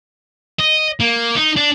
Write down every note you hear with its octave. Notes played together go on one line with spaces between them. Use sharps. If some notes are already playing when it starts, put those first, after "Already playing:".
D#5
A#3
D#4
D4